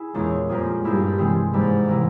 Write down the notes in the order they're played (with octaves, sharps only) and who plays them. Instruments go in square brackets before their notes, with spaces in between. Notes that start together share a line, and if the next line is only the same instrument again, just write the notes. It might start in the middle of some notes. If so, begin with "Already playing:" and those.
Already playing: [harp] E4 G#4
[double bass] E2 [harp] A#2 G#3 C#4
[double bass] F2 [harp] G3 A#3 F4 G#4
[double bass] G2 [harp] A#3 E4 G#4 C5
[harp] C3 E3 G#3 C4
[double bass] G#2 [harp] E3 G3 A#3
[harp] C3 E3 A#3